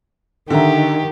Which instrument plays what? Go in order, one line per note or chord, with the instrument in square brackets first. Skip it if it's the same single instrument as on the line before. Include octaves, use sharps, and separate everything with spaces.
[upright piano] D3 E5 A#5 [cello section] D#3 [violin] G4